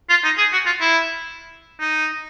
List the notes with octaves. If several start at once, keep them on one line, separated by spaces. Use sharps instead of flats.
F4
D#4
G#4
F#4
F4
E4
D#4